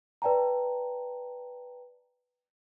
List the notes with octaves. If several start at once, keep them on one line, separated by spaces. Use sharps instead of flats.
B4 D5 G5 A5 A#5